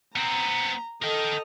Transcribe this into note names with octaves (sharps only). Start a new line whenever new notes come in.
B3 C4 A#5
A4 A#4 D#5 G5